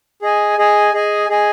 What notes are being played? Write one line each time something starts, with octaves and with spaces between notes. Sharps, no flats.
G#4 D#5 G#5
G#4 D#5 G#5
G#4 D#5 G#5
G#4 D#5 G#5